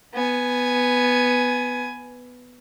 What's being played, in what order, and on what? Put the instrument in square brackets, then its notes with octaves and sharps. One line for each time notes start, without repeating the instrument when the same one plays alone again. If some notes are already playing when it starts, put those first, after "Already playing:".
[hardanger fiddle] B3 G#5